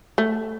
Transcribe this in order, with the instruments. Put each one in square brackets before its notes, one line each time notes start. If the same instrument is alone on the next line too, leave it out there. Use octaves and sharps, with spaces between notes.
[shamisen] A3